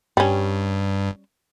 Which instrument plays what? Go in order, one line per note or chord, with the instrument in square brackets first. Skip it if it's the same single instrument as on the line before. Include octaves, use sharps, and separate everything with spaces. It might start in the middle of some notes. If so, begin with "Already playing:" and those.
[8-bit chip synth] G2 [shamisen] G3 C#4